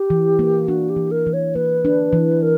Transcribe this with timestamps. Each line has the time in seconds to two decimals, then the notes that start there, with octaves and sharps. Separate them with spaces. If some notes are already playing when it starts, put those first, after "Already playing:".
Already playing: G4
0.10 E3
0.39 A#3
0.68 D4 F#4
0.90 G4
0.96 E3
1.11 A#4
1.27 E3
1.33 C#5
1.55 A#3 B4
1.85 D4
2.13 E3
2.42 A#4